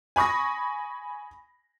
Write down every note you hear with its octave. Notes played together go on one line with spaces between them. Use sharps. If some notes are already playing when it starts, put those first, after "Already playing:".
G#5 B5 C#6 D#6 A#6